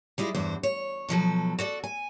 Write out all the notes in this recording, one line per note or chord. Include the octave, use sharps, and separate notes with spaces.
G3 G#3 E4 F4
E2 G2 F#4 C5
C#5
B2 F3 F#3 A4
F#4 A4 D5
G#5